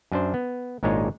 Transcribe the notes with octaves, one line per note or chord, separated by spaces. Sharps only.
F#2 D4 C5
B3
G#1 A#2 G#3 D4 D#4 C#5